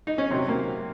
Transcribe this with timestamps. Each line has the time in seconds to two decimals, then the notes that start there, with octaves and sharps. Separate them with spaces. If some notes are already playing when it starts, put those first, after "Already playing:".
0.07 D#4
0.18 C#4
0.30 C3 D#3 F#3 C4
0.49 A#3